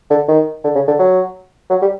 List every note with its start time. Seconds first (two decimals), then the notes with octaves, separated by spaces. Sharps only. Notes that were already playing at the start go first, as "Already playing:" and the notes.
0.11 D3
0.28 D#3
0.64 D3
0.75 C#3
0.88 D3
0.99 F#3
1.70 F#3
1.82 G3